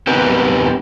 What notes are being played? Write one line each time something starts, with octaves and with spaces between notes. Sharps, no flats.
B3 C4 D#4 G4 A#4 B4